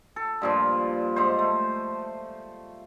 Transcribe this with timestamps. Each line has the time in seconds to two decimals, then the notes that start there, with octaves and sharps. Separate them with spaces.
0.16 A4
0.42 G2 A#2 F3
1.16 G#2 C5
1.39 A3